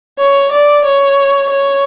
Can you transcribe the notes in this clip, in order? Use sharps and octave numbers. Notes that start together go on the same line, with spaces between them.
C#5
D5
C#5
C#5